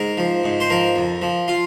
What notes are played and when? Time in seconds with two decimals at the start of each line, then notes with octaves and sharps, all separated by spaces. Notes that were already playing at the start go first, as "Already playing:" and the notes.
Already playing: G#2 A#4
0.17 F3
0.44 G#2
0.60 C5
0.70 F3 A#4
0.96 F2
1.22 F3
1.48 F4